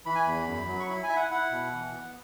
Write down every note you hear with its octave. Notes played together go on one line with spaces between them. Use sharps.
E3 B5
G#5
E2 B5
F#2
F#3
C#6
E4 B5
G#5
E4 E5
F#5
E4 F#5
B2
E3
B3